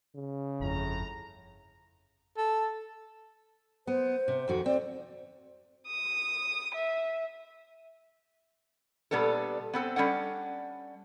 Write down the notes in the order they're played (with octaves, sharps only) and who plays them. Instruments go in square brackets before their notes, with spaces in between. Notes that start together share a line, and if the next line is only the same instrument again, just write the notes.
[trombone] C#3
[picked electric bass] G1 F2 [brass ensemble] A2 A#5
[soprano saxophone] A4
[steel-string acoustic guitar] B3 [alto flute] C5
[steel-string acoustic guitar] C3
F2 D#3 F#4
[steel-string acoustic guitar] C4 [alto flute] D5
[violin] D#6
E5
[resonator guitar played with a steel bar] A#2 G3 B3 D4 A4
B3 C4 A4
G3 C#4 D4 F#5